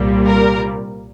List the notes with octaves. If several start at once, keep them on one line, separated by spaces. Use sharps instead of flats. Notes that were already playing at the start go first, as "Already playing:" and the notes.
Already playing: C2 A#2 G3
A#4